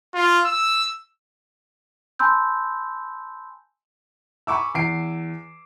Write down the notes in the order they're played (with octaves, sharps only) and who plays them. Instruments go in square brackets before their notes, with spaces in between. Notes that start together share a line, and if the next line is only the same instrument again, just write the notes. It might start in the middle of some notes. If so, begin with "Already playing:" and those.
[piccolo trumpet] F4
E6
[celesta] G#5 A5 B5 C6 E6 G6
[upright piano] G#5 B5 C#6 D6 E6
E2 G#5 C7 D7